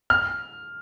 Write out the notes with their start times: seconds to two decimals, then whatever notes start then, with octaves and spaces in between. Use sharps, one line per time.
0.10 F6